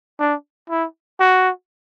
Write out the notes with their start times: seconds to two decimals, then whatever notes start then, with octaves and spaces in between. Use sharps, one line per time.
0.19 D4
0.70 E4
1.20 F#4